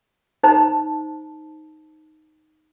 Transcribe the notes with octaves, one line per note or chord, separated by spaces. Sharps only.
D#4 C5 A5 A#5